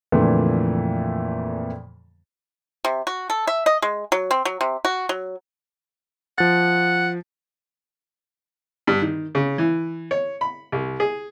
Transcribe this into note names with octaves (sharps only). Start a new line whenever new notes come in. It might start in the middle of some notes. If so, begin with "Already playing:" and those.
F2 A#2 D3 E3 A3 A#3
C3
F#4
A4
E5
D#5
G#3
F#3
C4
F#3
C3
F#4
F#3
F3 F#5 A6
G2
D#3
C#3
E3
C#5
B5
C2
G#4